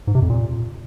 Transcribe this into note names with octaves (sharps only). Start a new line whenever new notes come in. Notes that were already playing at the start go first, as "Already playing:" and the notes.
G#2
C3
F2
A#2